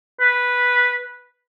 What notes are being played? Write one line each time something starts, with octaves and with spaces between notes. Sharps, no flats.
B4